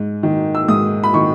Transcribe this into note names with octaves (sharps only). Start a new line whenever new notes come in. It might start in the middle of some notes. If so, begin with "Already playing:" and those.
Already playing: G#2
D#3
E6
G#2 D#6
B5
D#3 C#6